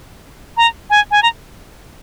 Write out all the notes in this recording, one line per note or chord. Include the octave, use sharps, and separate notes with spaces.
A#5
G#5
G#5
A#5